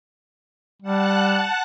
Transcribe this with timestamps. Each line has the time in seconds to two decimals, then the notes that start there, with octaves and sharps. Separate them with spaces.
0.83 G3 F#5 A5 F#6